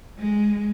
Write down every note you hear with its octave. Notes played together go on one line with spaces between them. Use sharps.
G#3